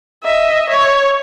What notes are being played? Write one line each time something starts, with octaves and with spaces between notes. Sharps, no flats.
D#5 E5
C#5